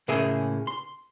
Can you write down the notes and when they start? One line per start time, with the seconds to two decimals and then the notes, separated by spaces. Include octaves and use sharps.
0.08 A2 C#3 A#3 C#4 G#4 E5
0.67 C6